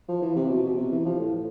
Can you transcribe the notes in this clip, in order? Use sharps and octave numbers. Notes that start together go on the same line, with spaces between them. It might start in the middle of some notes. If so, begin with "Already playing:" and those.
F3
E3
C3
B2
B2
C3
E3
F3
A2